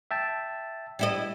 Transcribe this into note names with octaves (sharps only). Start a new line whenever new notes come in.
E5 G5 A5
G3 E4 D#5